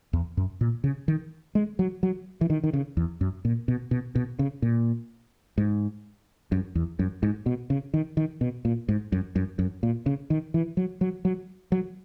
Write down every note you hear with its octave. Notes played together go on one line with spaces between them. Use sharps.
E2
F#2
A#2
C#3
D#3
G#3
F#3
F#3
E3
D#3
D#3
C#3
E2
F#2
A#2
B2
B2
B2
C#3
A#2
G#2
F#2
E2
F#2
G#2
B2
C#3
D#3
D#3
B2
A#2
G#2
F#2
F#2
F#2
A#2
C#3
D#3
E3
F#3
F#3
F#3
F#3